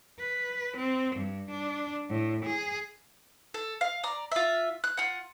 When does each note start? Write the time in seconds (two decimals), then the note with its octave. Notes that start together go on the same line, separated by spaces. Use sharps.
0.19 B4
0.77 C4
1.16 G2
1.51 D4
2.10 A2
2.45 G#4
3.54 A4
3.81 F5
4.03 D5 A#5
4.32 F4 E5
4.84 F#6
4.97 F4 F#5